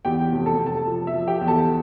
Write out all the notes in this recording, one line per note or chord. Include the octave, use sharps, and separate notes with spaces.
E2 G4 G5
F1
A4 A5
F1
A4 A5
F3
E5
F3
G4 G5
E2
A4 A5